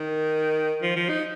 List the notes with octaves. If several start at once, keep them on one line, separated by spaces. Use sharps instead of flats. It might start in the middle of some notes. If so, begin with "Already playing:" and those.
Already playing: D#3
F3
F3
D#4